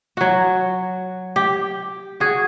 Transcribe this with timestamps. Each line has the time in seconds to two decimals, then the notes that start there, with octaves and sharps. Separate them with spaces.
0.17 F#3 F#4
1.36 G4
2.20 F#4 G#4